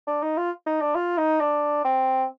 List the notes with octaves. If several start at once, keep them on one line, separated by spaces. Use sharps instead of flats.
D4
D#4
F4
D#4
D4
F4
D#4
D4
C4